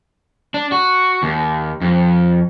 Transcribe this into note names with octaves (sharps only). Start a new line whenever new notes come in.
D4
F#4
D#2
F2